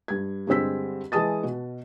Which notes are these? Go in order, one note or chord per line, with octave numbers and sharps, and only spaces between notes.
G2 G#6
G2 D3 G#3 C4 E6 B6
E3 G#3 A5 D#6 A6
B2